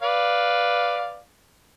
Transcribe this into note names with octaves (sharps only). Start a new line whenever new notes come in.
B4 D5 F5